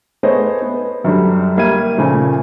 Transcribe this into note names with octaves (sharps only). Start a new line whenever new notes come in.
A3 B3 G#4 C5 C#5 D#5
B3
F#2 D3 G3
G3 A#3 E5 G#6 D#7
A#2 C#3 F3 A3